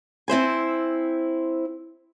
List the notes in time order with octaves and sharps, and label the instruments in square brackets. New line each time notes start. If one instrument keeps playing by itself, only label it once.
[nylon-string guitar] C4 E4 C5 G#5